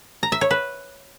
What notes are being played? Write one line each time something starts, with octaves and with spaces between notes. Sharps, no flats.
A#5
E5
C#5
B4